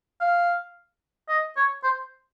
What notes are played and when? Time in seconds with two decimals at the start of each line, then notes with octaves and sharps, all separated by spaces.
0.21 F5
1.29 D#5
1.56 C#5
1.84 C5